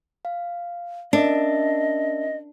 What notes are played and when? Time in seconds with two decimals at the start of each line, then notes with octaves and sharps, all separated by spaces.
0.25 F5
1.13 C#4 D4 A#4 D#5 E5